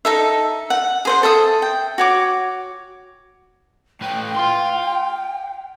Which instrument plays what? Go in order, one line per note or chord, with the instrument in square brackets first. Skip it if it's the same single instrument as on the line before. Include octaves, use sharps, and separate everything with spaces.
[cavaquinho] D#4 A4 E5
F#5
G#4 C5 F#5
A4 E5 D#6
G5
F#4 C#5 D6
[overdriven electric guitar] A2 B4 [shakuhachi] G5
[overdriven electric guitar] F5 C6